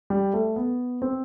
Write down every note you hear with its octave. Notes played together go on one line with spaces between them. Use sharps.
G3
A3
B3
C4